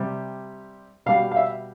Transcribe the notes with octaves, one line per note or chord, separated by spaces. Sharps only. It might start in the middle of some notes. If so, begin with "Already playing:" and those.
Already playing: C3 G3
B2 G3 F5
F5
E5